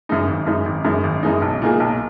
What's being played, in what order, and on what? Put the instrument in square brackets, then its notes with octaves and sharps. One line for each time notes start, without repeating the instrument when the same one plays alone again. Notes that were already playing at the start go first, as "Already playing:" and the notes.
[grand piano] F#2 E3 G#3 D#4
G#1
F#2 E3 G#3 D#4
G#1
F#2 E3 G#3 D#4
G#1
F#2 E3 G#3 D#4
B1
A#2 A#3 D#4 G#4
B1